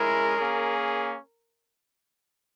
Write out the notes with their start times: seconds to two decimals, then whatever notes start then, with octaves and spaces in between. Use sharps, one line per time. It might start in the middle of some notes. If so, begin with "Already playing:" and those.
Already playing: G#3 C#4 E4 G#4 A#4
0.37 A#3 C#4 G#4